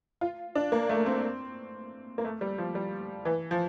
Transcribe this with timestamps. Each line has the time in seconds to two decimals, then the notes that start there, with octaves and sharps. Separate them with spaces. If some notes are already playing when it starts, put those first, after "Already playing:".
0.21 F4
0.55 D4
0.72 A#3
0.89 A3
1.06 C4
2.18 A#3
2.25 A3
2.41 G3
2.58 F3
2.75 G3
3.25 E3
3.51 F3